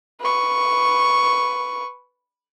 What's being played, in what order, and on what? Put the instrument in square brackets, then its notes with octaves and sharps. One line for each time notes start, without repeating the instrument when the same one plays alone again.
[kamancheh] B4 C#6